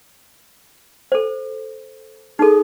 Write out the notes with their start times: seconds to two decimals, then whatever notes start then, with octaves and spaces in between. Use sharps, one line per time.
1.12 A4 C5
2.39 D#4 G#4 A4